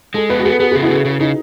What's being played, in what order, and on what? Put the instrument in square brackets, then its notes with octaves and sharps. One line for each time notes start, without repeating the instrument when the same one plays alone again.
[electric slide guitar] G#3 [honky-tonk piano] A4
[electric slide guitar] B3 [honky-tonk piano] B4
[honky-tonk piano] F#4
[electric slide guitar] B3 [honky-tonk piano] G#4
[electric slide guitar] B3 [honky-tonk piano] G#4
[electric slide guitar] C#3 [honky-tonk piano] G#4
[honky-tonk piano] E4
[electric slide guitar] C#3
C#3
[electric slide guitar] C#3 [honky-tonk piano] D#4